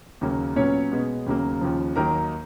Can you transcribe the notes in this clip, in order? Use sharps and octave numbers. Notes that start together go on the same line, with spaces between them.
D#2 C#3 F#3 A#3
A#2 F#3 B3 C#4 C#5
B2 G#3 B3
D#2 C#3 F#3 A#3
D#2 C#3 F3
D#2 D#3 F#3 A#3 A#4 A#5